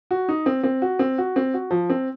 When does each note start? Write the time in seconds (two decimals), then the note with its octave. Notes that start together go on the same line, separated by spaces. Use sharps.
0.11 F#4
0.28 D#4
0.46 C4
0.64 C4
0.82 F#4
0.99 C4
1.18 F#4
1.36 C4
1.54 F#4
1.71 F3
1.90 C4